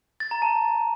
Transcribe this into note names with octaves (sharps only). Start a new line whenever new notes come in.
A6
A#5
A5